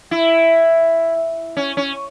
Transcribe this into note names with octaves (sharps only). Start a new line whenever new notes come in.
E4
C#4
C#4